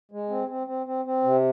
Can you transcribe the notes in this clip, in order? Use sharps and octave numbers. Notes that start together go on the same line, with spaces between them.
G#3
C4
C4
C4
C4
C4
C3